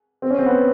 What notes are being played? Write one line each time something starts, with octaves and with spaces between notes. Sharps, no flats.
C4
C#4
C4
B3